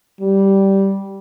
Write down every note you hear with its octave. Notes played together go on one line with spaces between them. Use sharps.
G3